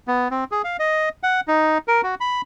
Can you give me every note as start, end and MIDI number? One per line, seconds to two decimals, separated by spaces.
0.08 0.28 59
0.31 0.44 60
0.52 0.62 68
0.64 0.77 77
0.79 1.09 75
1.23 1.41 78
1.48 1.78 63
1.88 2.01 70
2.03 2.15 66
2.21 2.41 83